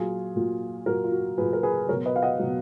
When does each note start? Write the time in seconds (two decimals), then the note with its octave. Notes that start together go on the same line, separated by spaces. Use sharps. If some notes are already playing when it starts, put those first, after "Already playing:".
Already playing: A#2 F#3 F4 G#4
0.36 A#2 F#3
0.86 A#2 F#3 F#4 A#4
1.04 F4
1.12 F#4
1.37 F#3 G#4 B4
1.41 A#2
1.53 A#4
1.63 G#4 B4
1.88 F#3 A#4 C#5
1.92 B2
2.06 B4 D#5
2.16 F5
2.22 D#5 F#5
2.39 B2 F#3